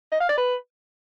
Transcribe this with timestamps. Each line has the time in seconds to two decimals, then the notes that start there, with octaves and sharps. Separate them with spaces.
0.12 D#5
0.20 F5
0.29 D5
0.37 B4